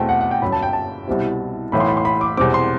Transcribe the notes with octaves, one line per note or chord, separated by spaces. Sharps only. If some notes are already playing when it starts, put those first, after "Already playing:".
Already playing: E2 B2 A3 C4 G5
F#5
F#5
G5
G1 F#2 F#3 B5
A5
G5
A5
C2 B2 G3 C4 E4
B1 A2 E3 B3 B5
C6
B5
C6
B5
D6
E1 E2 C3 G3 C4 D6
C6